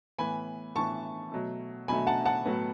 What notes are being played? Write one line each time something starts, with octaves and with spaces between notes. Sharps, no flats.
A2 E3 B3 G#5 B5
A2 E3 B3 A5 C#6
B2 F#3 A3
B2 F#3 A3 G#5 B5
F#5 A5
F#5 A5
A2 F#3 B3